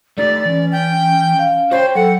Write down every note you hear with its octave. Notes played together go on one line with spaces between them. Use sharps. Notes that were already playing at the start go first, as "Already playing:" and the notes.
A3 D#4 G4 D5
E3 C#4
G5
F5
F#4 C5 C#5 G5
F#3 A4 F#5